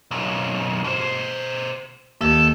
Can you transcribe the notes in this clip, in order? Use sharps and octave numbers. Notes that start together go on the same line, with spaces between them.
B1 F#2
B2 C5
D#2 A4